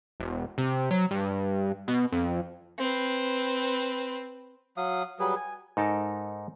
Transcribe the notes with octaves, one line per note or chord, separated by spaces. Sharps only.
E1
C3
F#3
G2
B2
F2
C4 B4
F#3 F5 D#6
F#3 G3 G#4 B4
G#5
G#2 D#4 A4 A#4 A5